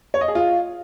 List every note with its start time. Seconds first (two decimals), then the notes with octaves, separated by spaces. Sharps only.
0.14 C#5
0.21 D#5
0.28 G#4
0.35 F4